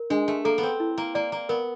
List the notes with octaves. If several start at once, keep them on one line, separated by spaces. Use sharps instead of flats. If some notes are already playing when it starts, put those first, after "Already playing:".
Already playing: A#4
G#3 D4
A3
A#3 A4
B3
C4
E4
A#3
A#3 D5
A#3
B3 A#4